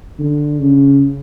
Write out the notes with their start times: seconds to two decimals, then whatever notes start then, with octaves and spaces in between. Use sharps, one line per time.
0.19 D3
0.60 C#3